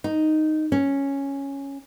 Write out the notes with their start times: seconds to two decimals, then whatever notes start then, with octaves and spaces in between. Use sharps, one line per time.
0.04 D#4
0.72 C#4